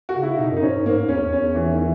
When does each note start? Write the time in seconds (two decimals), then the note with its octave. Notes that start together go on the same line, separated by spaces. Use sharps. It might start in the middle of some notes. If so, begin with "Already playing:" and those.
0.09 F#4
0.16 C#3
0.23 E4
0.39 B2 D#4
0.51 F#2
0.57 D#4
0.62 G#2 C#4
0.74 G#2
0.86 G#2 A#3
1.08 E2 C#4
1.21 E2
1.31 E2 C#4
1.55 E3
1.71 D#3
1.78 E3